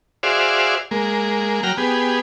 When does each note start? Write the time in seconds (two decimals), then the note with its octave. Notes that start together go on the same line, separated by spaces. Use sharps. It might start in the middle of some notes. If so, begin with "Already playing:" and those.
0.23 F#4 G#4 C5 D5 E5 F5
0.91 G#3 A#3
1.63 F#3 G5 A#5 F6
1.77 B3 G4 G#4